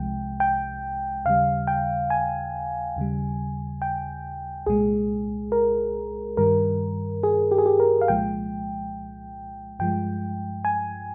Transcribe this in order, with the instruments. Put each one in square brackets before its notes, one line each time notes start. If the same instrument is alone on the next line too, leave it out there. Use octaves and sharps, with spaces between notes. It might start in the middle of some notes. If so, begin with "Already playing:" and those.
Already playing: [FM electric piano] C2 C3 F3 G#3 G5
G5
D#2 C#3 G3 F5
G5
G#5
D#2 C#3 G3
G5
C2 A#2 G#3 G#4
A#4
G2 D#3 G3 A#4
G#4
G4
G#4
G4
A#4
F5
C2 A#2 F3 G#3 G5
G2 F3 G#3 G5
G#5